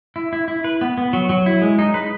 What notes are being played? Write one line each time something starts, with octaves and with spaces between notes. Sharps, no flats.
E4
E4
E4
B4
B3
B3
F#3
F#3
E4
G#3
D#4
B4